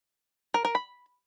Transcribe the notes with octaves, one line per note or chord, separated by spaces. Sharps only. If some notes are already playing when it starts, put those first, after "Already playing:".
A#4
A#4
B5